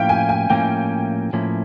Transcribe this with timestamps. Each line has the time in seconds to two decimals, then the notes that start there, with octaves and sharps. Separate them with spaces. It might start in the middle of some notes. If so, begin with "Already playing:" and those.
Already playing: A2 F3 A#3 C#4 E4 F5 G5
0.09 G#5
0.29 G#5
0.50 A2 F3 A#3 C#4 E4 G5
1.33 A2 F3 A#3 C#4 E4